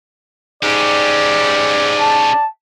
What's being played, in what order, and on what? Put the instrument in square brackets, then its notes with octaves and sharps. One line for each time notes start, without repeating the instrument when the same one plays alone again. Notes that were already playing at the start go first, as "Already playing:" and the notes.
[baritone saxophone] G#2 [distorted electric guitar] C#4 G4 [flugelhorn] D5
[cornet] A5